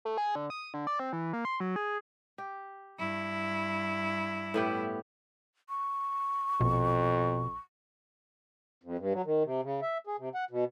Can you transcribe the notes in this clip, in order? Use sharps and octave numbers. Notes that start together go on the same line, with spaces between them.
A3
G#4
D3
D#6
D3
D5
C4
E3
A#3
C6
F#3
G#4
G4
G2 E4
A2 B3 G4
C#6
A#1 F2 B2
F2
G2
F#3
D#3
C3
C#3
E5
G#4
C3
F#5
B2